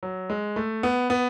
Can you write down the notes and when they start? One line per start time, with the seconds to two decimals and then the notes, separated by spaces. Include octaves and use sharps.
0.03 F#3
0.30 G#3
0.56 A3
0.83 B3
1.10 B3